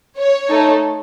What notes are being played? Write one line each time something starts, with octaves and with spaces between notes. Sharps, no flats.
C#5
A3 D#4 A4